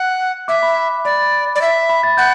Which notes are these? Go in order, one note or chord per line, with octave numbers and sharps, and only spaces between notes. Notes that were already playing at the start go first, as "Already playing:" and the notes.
Already playing: F#5 F#6
E5 D6
B5
D5 B5
D5
E5
B5
A6
F#5 G6